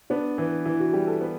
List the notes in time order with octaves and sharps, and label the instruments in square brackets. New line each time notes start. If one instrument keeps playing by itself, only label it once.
[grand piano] B3 [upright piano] D4
[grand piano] E3
[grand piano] E3 [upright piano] E4
[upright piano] F#4
[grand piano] G3 [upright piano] G4
[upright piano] A4
[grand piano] B3